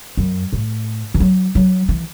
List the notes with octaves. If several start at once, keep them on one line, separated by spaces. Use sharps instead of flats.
F#2
A2
E3
F#3
F#3
E3